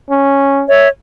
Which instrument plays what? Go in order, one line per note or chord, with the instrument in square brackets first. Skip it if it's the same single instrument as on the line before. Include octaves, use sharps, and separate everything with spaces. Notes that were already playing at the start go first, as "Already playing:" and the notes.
[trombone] C#4
[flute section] C#5 E5